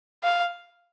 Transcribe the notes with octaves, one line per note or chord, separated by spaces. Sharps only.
F5